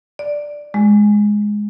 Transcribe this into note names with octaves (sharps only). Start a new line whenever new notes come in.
D5
G#3